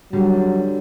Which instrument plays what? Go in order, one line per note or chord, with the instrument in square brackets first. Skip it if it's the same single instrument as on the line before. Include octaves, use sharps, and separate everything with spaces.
[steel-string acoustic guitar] D3 G3 [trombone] F#3